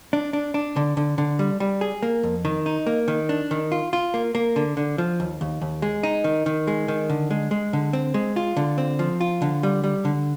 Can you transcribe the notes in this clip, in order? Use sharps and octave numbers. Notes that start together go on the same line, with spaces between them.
D4
D4
D4
D3
D3
D3
G3
G3
G#4
A#3
F2
D#3
D#4
A#3
D#3
D4
D#3
F4
F4
A#3
A#3
D3
D3
F3
D#2
D#2
D#2
G#3
D#4
D#3
D#3
G#3
D#3
D3
G#3
G#3
D3
C4
G#3
F4
D3
C4
F3
F4
D3
G3
G3
D3